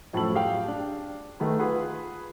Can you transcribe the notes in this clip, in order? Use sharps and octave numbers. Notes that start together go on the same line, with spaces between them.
F#2 A2 F3 A4 B5 F#7
G4 G#4 F5 G5
D4
D#3 A3 G#4 B4
F4 G#4 B4 F#5